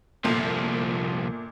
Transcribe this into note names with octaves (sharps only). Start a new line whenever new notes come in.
G1 C2 A#2 F3